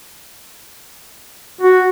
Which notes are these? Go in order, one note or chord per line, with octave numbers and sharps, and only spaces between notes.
F#4